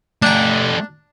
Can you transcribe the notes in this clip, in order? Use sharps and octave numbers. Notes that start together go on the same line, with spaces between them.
A3 D4 G4 A#5